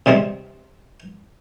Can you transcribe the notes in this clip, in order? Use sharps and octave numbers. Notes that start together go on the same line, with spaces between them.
C3 G3 G#3 C4